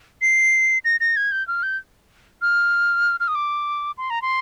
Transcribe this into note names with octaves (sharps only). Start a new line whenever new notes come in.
C7
A#6
A#6
G#6
G6
F6
G6
F6
F6
D#6
D6
C6
A#5
C6